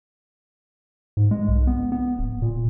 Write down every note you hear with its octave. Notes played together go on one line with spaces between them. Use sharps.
G#2
G#3
B1
B3
B3
D1
A#2